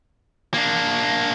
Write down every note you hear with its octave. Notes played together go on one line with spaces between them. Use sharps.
A#3 D4